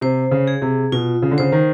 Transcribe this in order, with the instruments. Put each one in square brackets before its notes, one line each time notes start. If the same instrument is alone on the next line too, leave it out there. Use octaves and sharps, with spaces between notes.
[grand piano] C3 [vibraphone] C5
[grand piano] C#3
[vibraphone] G#4
[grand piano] C3
[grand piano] B2 [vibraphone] F4
[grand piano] C#3
D3
[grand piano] C#3 [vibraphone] C5
[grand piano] D#3